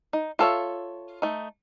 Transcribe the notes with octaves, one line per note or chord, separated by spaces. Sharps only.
D#4
F4 A4 C#5 E5
A3 D#4